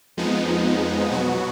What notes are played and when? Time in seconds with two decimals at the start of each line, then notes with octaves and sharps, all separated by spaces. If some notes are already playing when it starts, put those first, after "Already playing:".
0.17 F2 F3 G#3 B3 D#4
1.11 B2 F#3 B3 F#4